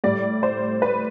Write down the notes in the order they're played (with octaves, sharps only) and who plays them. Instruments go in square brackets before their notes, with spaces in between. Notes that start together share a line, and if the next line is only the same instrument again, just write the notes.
[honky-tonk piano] A2 G3 D5
C5
B4